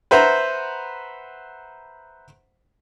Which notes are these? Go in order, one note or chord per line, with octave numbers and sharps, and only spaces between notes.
B4 C5 E5 F#5 A#5